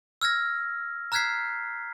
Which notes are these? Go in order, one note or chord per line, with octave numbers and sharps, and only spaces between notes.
E6 F6 G#6 A#6
A#5 F6 F#6 G#6 B6 C7